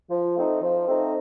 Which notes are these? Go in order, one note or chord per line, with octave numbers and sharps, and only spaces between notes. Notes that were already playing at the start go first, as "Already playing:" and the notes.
F3
A3 C4 D#4
F3
A3 C4 D#4